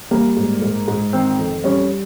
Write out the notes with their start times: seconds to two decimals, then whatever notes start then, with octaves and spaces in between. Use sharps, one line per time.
0.11 G3 A#3
0.37 G#2
0.62 G#2
0.88 G#2
1.13 D#3 C4
1.39 F2
1.64 G3 C#4